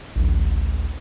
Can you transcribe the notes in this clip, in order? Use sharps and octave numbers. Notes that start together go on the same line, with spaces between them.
A1 D2